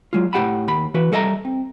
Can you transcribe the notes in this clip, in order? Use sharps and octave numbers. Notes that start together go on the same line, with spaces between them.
F#3 G#3 F4
A2 F4 G4 F#5 A5 B5
D#2 B5
E3 F#4 B4
G3 A4 D#5 E5 F#5 A#5
C4